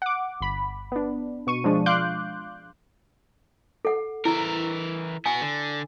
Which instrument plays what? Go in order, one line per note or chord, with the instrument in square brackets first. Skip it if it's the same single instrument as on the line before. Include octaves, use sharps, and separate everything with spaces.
[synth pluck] F#5 D6
G1 B5
B3 D4
B2 C#6 D#7
F3 G#3 D4
F5 C6 D6 F#6 G6
[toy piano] A4 F#5
[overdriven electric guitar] E3 A#4 [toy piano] E4
[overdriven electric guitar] B3 F#4 [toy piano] G#5
[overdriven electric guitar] D3